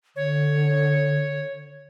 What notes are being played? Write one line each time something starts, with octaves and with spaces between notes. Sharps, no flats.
D3 C#5